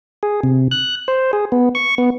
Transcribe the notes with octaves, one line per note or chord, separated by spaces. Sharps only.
G#4
C3
F#6
C5
G#4
B3
C#6
B3